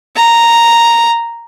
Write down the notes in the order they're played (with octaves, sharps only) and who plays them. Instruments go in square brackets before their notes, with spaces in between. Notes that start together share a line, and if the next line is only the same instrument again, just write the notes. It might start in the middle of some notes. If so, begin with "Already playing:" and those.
[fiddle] A#5